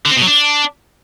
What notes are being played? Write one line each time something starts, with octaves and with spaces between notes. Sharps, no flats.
D3
C4
B2
F#3
D4